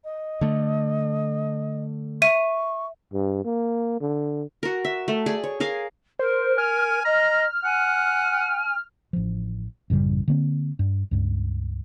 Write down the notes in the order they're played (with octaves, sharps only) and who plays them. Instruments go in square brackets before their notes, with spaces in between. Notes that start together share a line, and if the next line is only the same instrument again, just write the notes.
[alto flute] D#5
[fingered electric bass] D3 A3
[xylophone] E5 D#7 [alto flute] C#6
[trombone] G2
A#3
D3
[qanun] F#4 A#4
E5
A3
G#4 D5
C#5
G#4 A#4 F5
[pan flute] A#4 [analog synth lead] C5
[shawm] G#5 [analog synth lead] F6
[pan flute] D#5 [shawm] A#5
[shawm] F#5 [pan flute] G#5
[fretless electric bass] A1 F3
A1 F#2 C#3 G3
D3 A#3 C4
G2
C#2 G2